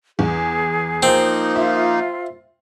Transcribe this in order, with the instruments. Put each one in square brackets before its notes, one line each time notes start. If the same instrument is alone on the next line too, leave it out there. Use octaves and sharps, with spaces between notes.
[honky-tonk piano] E2 [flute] G#4
[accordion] F3 A#3 D#4 [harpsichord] C4
[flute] F4 [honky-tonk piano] E5